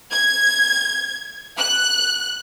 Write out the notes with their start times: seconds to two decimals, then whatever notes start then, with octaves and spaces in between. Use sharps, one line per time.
0.11 G#6
1.57 F#6